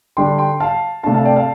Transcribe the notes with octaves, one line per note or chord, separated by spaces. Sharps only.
D3 G3 D4 G5 C6
G5 C6
F5 A5
C3 A3 D4 F5 A5
F5 A5
D5 G5
F5 A5